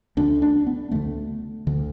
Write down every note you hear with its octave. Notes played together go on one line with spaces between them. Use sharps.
D2 D3 D4
D4
B3
D2 D3 A3
D2 D3